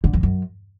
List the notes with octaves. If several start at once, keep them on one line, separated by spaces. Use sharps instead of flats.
D3
F2
F#2